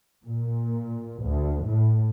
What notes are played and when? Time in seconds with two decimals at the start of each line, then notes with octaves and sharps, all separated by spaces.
0.25 A#2
1.23 D2
1.65 A2